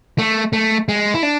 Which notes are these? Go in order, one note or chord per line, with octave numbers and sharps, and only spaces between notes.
A3
A3
G#3
E4
D4